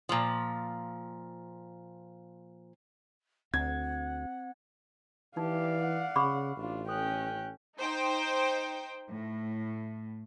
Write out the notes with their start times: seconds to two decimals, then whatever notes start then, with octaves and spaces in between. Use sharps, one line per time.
0.09 A#2 F3
3.54 D2 C4 F#5 G#6
5.37 E3 D#4 G4 D5 F5
5.81 F#5
6.16 C#3 B5 C#6 D6
6.57 A1 D4 F4
6.89 C#4 A4 G5 F#6
7.77 D#4 C5 G5
9.11 A2